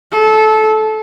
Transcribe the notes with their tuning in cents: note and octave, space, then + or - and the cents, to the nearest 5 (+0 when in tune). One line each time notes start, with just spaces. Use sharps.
A4 -20